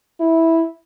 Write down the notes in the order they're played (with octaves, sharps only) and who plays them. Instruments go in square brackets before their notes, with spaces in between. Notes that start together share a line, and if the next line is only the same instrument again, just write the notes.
[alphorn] E4